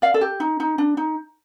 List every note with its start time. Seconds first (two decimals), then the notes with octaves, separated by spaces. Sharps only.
0.02 D5 F5
0.14 A4
0.21 G4
0.40 D#4
0.60 D#4
0.78 D4
0.97 D#4